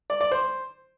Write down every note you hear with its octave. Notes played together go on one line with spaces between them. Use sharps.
D5
D5
C5